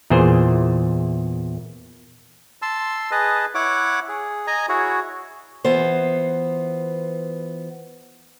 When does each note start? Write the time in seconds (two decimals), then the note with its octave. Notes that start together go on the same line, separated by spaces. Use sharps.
0.10 E2 A#2 E3 G#4 C5
2.62 A5 C6 E6
3.11 G#4 B4 D#5 A5
3.55 E4 C#5 F#5 D6
4.09 G#4
4.47 D#5 G#5 A#5
4.69 E4 F#4 G#4 C#5
5.64 E3 B3 F4 C5